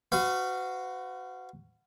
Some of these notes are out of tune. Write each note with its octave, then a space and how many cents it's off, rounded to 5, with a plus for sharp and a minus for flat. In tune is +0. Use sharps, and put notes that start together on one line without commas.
F#4 +0 B4 +45 F5 -20